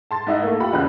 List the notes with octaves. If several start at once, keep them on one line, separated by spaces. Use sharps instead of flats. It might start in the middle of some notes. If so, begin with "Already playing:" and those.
A5 C6 A6
G#2 E4 D#5 F#5 E6
A3 A#3
F4 G4 F#5 B5
E2 C#3 E4 B5 F#6